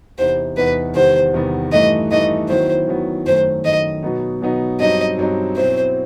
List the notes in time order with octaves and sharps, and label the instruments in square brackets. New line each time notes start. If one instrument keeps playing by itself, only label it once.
[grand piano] E2 C3 E3 B3 D#4 [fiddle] C5
[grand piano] E2 C3 E3 B3 D#4 [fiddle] B4
[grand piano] E2 C3 D#3 G3 B3 [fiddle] C5
[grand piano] E2 C3 D#3 G3 B3
[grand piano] G2 E3 A3 D#4 [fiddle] D#5
[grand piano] G2 E3 A3 D#4 [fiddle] D#5
[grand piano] D#3 F#3 B3 E4 [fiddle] C5
[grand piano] D#3 F#3 B3 E4
[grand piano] F#2 D#3 A3 [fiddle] C5
[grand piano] F#2 D#3 A3 [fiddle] D#5
[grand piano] B2 F#3 B3 D#4
B2 F#3 B3 D#4
[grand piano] G2 F#3 C4 D#4 [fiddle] D#5
[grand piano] G2 F#3 C4 D#4
[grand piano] B2 F#3 C4 E4 [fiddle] C5